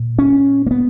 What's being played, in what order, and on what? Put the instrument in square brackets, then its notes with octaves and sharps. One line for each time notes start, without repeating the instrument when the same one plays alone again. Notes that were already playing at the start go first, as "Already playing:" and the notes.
Already playing: [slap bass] A#2
C#4
A#3
B3